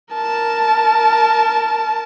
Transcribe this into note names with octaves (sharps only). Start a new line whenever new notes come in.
A#4 A5